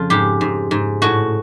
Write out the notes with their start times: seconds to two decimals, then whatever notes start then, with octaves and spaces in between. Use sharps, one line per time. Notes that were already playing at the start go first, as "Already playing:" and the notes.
Already playing: F2 C#3 F4
0.10 G#2 G4
0.41 G#2
0.71 G#2
1.02 A2 F#4